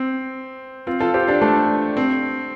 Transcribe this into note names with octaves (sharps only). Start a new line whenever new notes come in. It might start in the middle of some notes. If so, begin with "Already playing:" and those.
Already playing: C4
C4 F4
F4 A4
G4 C5
D4 G4
A3 D4
C4